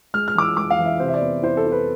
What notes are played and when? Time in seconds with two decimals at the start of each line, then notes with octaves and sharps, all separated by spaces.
0.14 G#3 F6
0.28 F6
0.35 E3 D6
0.42 E6
0.57 G#3 D6
0.70 F5
0.79 E3
0.85 E5
1.00 C3 C5
1.08 E5
1.14 D5
1.22 B3
1.42 E4 C5
1.57 A4
1.65 E4
1.72 B4